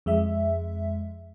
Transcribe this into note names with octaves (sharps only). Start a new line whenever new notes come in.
F2 G#3 E5